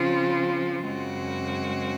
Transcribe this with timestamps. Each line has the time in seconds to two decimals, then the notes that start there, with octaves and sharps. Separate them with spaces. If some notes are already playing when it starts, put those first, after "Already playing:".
Already playing: C#3 F3 C4 F4
0.85 F#2 C#3 G#3 C4 F#4